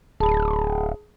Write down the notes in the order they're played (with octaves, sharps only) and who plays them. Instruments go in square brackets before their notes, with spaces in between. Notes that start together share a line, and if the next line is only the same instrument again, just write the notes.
[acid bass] D1 [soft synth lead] G#4 [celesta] A5 B5